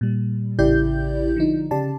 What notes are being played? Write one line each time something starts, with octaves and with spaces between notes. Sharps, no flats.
A#2 G3
A1 C#3 E4 G4 D5 G6
D3 F3 D#4
C#3 G4 D5 A5